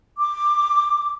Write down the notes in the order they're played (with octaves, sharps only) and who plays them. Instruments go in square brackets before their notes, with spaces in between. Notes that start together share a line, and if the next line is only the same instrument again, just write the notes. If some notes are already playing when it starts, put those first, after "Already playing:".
[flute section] D6